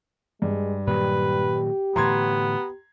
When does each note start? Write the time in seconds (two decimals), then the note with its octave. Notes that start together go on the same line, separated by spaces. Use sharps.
0.42 G2 G#3
0.87 A#2 D#3 F#3 G4 B4
1.96 A2 D3 E3 B3 A#5 C6 G#6